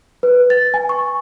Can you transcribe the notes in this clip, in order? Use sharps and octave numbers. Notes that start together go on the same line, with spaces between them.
B4
A6
G#5
C#6